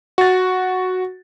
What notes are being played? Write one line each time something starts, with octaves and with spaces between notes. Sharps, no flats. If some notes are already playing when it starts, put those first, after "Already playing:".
F#4 A6